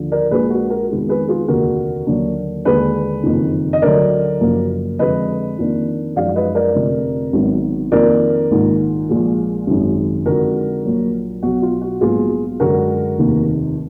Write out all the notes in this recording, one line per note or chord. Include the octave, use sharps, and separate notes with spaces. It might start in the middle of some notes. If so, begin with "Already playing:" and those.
Already playing: D#2 D3 F3
A#4 D5
A#1 A#2 G#3 D4 G#4 B4
F#4
F#4 A#4
F2 D#3 G#3 B3
G#4 B4
F4 G#4
F1 D#2 D3 F#4 A#4
D#2 D3 F#3 A#3 D4
D#2 D3 G#3 G#4 B4
F#1 F2 D#3
D#5
D2 D3 F#3 A#4 D5
F#1 F#2 F3 A#3
F2 D3 F3 G#3 B4 D#5
F2 D#3 A#3 D4
F#2 F3 G#3 D#4 D5 F5
B4 D#5
A#4 D5
F1 F2 D3
G#1 G#2 F#3 B3 D#4
F2 D#3 A#3 A#4 D5
A#1 G#2 D#3
A#1 A#2 F3 G#3
G#1 F#2 D#3 G#3
F2 D3 G#3 D#4 F#4 A#4
A#1 A#2 F#3
B1 B2 F#3 F#4
F4
F#4
A#1 G#2 F#3 B3 F4 G#4
F#2 D3 G#3 F#4 A#4
F1 D#2 D#3